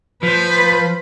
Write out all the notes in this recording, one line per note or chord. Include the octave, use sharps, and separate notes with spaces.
F3 B4 C5